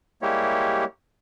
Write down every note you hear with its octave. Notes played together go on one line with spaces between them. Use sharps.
G3 G#3 A#3 E4 G4 C#5